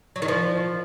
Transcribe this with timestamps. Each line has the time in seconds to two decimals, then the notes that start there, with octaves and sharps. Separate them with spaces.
0.16 F#3
0.22 D#3
0.28 F3